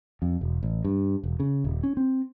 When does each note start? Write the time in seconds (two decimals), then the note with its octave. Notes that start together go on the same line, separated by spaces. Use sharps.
0.22 F2
0.41 E1
0.63 A1
0.84 G2
1.23 E1
1.40 C#3
1.64 D#1
1.83 C#4
1.97 C4